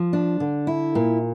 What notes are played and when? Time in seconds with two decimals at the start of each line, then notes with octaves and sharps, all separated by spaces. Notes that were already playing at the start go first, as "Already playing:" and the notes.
Already playing: F3
0.13 D4
0.40 D3
0.67 E4
0.95 A#2